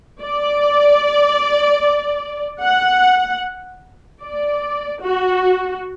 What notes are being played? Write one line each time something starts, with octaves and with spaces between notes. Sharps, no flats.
D5
F#5
D5
F#4